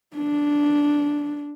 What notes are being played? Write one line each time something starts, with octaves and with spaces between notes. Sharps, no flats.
D4